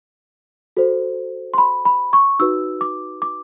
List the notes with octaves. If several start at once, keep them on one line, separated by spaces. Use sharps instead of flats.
F#4 A4 C5
C6
B5
B5
C#6
D#4 F#4 B4 E6
D6
D6